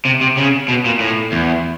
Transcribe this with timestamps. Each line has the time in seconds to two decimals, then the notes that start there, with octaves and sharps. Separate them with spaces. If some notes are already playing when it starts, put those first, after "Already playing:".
0.05 C3
0.21 C3
0.37 C#3
0.68 B2
0.85 A#2
1.00 A2
1.32 E2